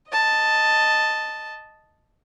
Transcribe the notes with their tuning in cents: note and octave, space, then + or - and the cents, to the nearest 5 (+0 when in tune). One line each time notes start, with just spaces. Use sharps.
D#5 +0 A5 +0